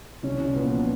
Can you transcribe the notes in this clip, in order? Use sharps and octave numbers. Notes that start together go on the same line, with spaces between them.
C2 C#4
C2
A#2 B3
F3